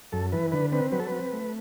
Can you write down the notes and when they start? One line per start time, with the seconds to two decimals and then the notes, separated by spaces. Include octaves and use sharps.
0.12 F#2 A4
0.32 E3 B4
0.52 D3 B4
0.72 C4 B4
0.92 F#3 B4
1.00 A4
1.07 C4 B4
1.33 A3